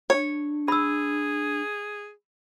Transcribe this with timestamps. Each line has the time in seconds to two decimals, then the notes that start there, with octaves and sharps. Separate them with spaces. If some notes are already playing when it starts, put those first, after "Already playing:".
0.10 D4 C#5
0.68 G#4 B5 E6